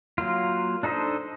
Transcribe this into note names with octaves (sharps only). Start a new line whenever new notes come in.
F#3 A#3 F4
D4 D#4 A4 C5 D#5